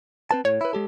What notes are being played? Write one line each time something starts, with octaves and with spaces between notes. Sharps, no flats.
C4 B4 A5
A2 C#5
E4 B4
G#3 G4 A4